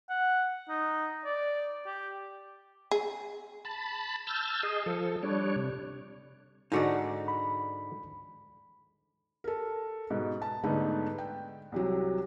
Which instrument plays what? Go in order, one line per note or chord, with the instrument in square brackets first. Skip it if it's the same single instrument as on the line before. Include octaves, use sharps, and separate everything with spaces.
[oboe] F#5
D#4
D5
G4
[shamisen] G#4
[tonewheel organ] A5 B5
A5 E6 F6 G6
G#4 D#5
F3 A4
G3 D4 C#5
C3
[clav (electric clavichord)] G#2 D3 [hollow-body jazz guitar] D#4 F#4 D5
[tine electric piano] B5
[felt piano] A4 A#4
G#2 B2
A5
G#2 D3 A3 B3 D#4
G5
C2 C3 F#3